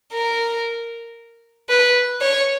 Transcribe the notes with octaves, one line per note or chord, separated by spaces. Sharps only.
A#4
B4
C#5